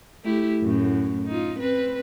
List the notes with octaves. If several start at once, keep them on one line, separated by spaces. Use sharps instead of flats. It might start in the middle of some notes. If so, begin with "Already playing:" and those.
A3 E4 G4
F#2 A2
D#4 F4
C4 B4